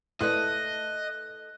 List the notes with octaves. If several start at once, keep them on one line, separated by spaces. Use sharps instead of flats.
A3 E4 A4 B4 D5 D#5 F#6